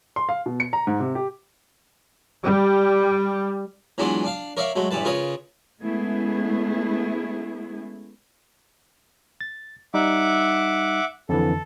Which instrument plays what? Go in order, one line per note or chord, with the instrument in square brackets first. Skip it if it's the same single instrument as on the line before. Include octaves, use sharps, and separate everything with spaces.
[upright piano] C6
F5
B2
C#7
A#5
G#2
C3
G4
[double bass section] G3
[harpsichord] E3 F#3 G#3 B3 D4 F4
D4 F5
A#4 C#5 D5 E5 F5
F#3 G#3 A3
A1 G2 E3 B4 A5
C#3 F4 A#4 B4 C#5 D#6
[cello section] G#3 A3 B3 C#4 E4 G#4
[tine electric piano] A6
[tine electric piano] G3 D#4 [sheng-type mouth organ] E5 F#5 D6
[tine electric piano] F2 D3 E3 [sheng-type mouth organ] A4